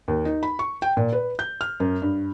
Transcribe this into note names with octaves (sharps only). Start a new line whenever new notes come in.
D#2
D#4
B5
C#6
G5
A#2
B4
G6
F6
F#2
G2